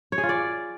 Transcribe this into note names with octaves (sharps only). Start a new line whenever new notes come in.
C#5
G#4
F4
D5